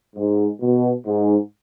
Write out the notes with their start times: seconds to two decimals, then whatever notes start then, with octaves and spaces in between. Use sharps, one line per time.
0.15 G#2
0.61 B2
1.06 G#2